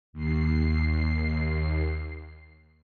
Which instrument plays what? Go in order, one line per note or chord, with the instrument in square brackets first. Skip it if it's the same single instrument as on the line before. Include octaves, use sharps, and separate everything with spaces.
[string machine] D#2 C7